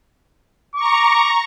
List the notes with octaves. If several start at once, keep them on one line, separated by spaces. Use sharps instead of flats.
A#5 C#6 D6